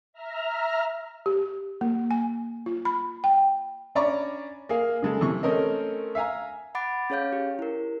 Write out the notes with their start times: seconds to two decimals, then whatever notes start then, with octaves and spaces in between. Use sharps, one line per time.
0.13 E5 A#5 F6
1.26 G4
1.81 A#3
2.11 G#5
2.66 F4
2.85 B5
3.24 G5
3.95 C#4 D4 D5 A#5 B5 C#6
4.69 A#3 G#4 F5
5.03 C#3 G#3 A4
5.21 C3 E3 C#6
5.43 A3 C4 C#4 A#4 D#5
6.15 E5 F5 G#5 A#5
6.75 F#5 B5 D6 A6 D7
7.10 C#4 G#4 C#5 F5 G6
7.33 G4
7.59 E4 A#4